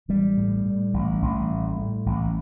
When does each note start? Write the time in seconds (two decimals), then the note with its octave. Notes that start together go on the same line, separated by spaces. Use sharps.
0.09 A1 G3
0.37 A2
0.66 A2
0.94 A1
1.22 A1
1.50 A2
1.78 A2
2.06 A1